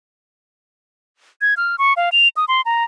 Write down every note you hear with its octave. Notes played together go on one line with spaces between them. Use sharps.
G#6
F6
C#6
F5
F7
D#6
C6
A#5